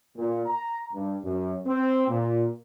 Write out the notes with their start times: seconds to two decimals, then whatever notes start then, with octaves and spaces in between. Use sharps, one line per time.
0.15 A#2
0.46 A#5
0.93 G2
1.23 F#2
1.64 C4
2.07 A#2